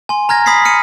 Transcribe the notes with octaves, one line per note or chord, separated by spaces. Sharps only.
G#5 C6
A#5 F6 G#6 A#6
B5 D#6 G#6 B6 C7
F6 C#7 D#7